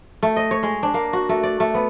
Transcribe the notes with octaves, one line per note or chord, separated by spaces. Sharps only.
A3
D#5
C#5
G#3
D4
A#3
F#4
A3
D5
A3
B3